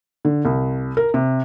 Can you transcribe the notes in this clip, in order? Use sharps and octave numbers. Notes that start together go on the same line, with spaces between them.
D3
C2
A#4
C3